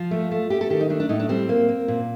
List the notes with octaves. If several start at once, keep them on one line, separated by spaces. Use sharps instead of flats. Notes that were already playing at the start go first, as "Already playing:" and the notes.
Already playing: F3 F4
A3
A3
A3 G4
A4
D#3 G4
D#4
A3 D4
D4
A2 D#4
D4
G3 C4
A#3
A#3
A#2